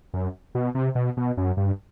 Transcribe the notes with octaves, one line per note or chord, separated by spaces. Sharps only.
F#2
B2
C3
B2
B2
F#2
G2